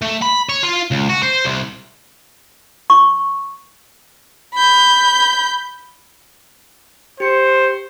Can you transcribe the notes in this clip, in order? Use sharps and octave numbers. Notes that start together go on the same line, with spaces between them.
A3
B5
C#5
F4
C#2
F#4
C5
C2
C#6
B5 G6
G4 C5 C#7